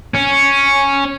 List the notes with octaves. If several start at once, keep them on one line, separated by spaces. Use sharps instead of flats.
C#4